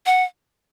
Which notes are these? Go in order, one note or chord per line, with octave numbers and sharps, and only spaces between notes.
F#5